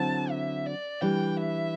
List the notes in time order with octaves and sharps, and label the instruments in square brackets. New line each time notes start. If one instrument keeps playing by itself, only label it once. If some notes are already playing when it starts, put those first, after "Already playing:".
Already playing: [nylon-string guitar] D3 F#3 C4 E4 [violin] A5
[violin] E5
D5
[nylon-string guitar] E3 G3 D4 [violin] G5
[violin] E5